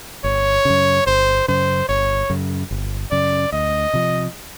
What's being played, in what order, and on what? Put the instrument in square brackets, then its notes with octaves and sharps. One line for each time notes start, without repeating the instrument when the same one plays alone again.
[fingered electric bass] G1 [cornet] C#5
[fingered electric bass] F#2 C#3
[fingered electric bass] G1 [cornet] C5
[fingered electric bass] F#2 C#3 [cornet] C5
[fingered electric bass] G1 [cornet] C#5
[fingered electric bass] F#2 C#3
G1
[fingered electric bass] F#2 C#3 [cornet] D5
[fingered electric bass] D2 [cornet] D#5
[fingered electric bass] C3 F3